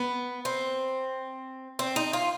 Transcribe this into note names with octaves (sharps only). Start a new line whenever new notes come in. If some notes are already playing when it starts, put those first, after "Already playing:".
Already playing: B3
C4
C4
D#4
F4